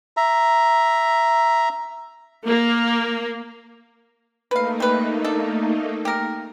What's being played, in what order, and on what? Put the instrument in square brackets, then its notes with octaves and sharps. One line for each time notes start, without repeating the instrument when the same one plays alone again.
[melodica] E5 A#5
[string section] A#3
[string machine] A3 A#3 D#4 [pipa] B4 F5
[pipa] G3 B4
D4 A4
G4 A#4